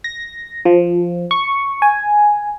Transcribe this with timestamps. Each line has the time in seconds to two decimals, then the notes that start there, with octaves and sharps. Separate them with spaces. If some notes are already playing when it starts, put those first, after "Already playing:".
0.04 A#6
0.65 F3
1.31 C#6
1.82 G#5